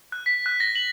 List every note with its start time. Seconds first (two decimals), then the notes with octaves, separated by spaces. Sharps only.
0.12 F#6
0.26 B6
0.46 F#6
0.60 A#6
0.75 F#7